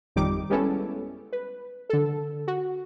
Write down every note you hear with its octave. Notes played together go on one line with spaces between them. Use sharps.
G#1 F2 D#3 G3 D#4 D6
G3 G#3 B3 C#4 E4 A4
B4
D3 A4
F#4